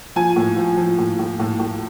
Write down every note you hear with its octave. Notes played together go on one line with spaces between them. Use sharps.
F3 G#5
A2
F3
F3
A2
A2
A2
A2